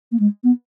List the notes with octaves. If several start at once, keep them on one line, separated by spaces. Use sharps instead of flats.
A#3
G#3
B3